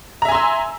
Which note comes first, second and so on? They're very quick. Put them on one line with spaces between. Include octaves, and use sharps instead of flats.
A#5 E5 G#5 C6 E6